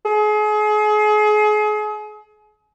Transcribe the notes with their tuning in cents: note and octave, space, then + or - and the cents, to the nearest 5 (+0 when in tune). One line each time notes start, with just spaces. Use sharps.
G#4 +35